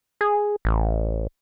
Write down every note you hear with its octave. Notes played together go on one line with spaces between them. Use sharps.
G#4
A1